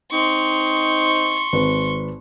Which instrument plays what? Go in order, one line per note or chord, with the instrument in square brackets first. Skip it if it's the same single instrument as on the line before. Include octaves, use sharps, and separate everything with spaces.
[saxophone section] C4 D#4 [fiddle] C6 C#6
[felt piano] G#1 B4